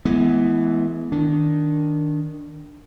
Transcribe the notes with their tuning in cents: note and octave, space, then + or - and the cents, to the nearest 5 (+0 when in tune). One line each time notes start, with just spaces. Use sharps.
E3 +5 G#3 +35 B3 +0
D#3 +0 D4 +0